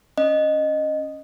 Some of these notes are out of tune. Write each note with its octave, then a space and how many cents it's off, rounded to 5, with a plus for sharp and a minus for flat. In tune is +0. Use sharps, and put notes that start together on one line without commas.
C#4 +0 D#5 -10